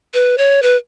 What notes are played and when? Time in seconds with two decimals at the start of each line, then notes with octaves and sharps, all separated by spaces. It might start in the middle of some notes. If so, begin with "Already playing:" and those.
0.14 B4
0.38 C#5
0.63 B4